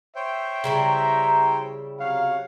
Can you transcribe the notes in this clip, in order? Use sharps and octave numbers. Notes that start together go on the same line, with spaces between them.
C5 C#5 E5 G5
C#3 G3 E4 A#5
C3 F#3 C#5 F5 F#5